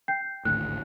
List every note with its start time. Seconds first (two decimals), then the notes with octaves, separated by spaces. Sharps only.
0.08 G5 G6 C7
0.45 G#1 D2 A2 F#6